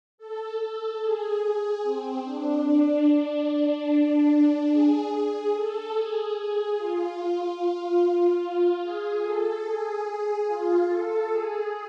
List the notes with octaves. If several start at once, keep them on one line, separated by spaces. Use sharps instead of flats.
A4
A4
G#4
G#4
C4
D4
D4
G#4
G#4
A4
G#4
G#4
F4
G#4
A4
G#4
F4
A4
G#4